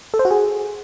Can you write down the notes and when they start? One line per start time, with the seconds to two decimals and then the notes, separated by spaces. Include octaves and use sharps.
0.14 A4
0.19 C5
0.25 F#4
0.31 G#4